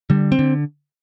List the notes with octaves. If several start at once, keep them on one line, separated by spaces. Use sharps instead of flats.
D3 G3
C4
D3